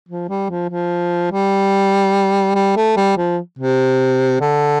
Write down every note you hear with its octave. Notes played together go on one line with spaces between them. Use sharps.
F3
G3
F3
F3
G3
G3
A3
G3
F3
C3
D3